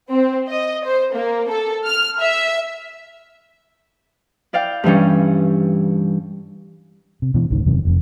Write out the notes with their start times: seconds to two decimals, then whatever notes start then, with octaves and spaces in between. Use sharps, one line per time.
0.11 C4
0.49 D#5
0.84 C5
1.14 A#3
1.49 A4
1.86 F6
2.20 E5
4.53 E4 D5 F5 G5
4.84 G2 E3 G3 C#4
7.22 C3
7.34 B2 E3
7.50 G#1 C#2 G#2 D#3
7.66 E1 F#2 C3 D#3
7.85 F1 F2